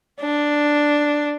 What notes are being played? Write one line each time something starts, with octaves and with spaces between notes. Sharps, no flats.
D4